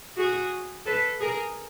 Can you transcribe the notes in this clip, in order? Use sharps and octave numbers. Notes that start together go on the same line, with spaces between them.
F#4 G#4
A4 B4
G#4 A#4